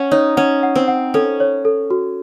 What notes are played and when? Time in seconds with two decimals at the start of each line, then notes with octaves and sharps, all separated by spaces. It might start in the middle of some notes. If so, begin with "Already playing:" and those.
Already playing: C#4 F#5
0.12 D#4 C#5
0.37 C#4 F#5
0.63 F#5
0.76 C4
0.88 F#5
1.14 C#4 A4
1.40 C#5
1.65 A4
1.91 F#4